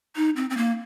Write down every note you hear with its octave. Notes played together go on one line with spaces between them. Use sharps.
D#4
C4
C4
A#3